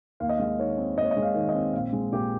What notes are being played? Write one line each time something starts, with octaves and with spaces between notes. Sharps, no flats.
D#2 F5
D#5
G#3 F5
D#3 C#5
C4
D#2 D#5
C#5
D#5
G#3
F5
D#3
D#5
C4
A#1 F5
G#3
A#2 G4